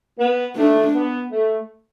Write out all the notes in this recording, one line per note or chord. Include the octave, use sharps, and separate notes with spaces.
B3
A3 D4
B3
A3